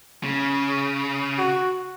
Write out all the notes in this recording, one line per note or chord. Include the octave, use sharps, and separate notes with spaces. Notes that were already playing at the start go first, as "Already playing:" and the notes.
C#3
F#4